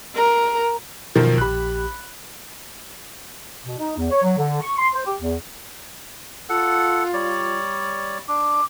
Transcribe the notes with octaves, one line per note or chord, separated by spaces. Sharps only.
A#4
F#2 B2 D#3 F3 A#4
A#1 G4 B5 F#6
B2
D#4
E2
C#5
F#3
D3
C#6
C6
C5
G4
E2
F4 A4 F#5
G3 C#5 D5
D4 D6